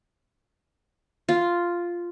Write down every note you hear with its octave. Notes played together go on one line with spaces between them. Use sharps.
F4